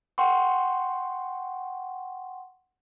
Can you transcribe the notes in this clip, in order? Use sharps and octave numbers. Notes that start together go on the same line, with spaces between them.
F#5 G5 C6 C#6